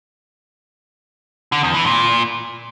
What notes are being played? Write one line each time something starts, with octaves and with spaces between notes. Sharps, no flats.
D3
E2
E3
A#2